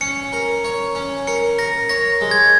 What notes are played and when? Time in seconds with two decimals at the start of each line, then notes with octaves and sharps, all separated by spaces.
0.01 C#4 C#7
0.33 A#4
0.64 C#5
0.95 C#4
1.27 A#4 C#7
1.58 A#4 A#6
1.89 C#5 A#6
2.21 G#3
2.31 G#6